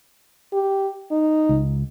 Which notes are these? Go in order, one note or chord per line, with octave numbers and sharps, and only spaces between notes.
G4
D#4
C#2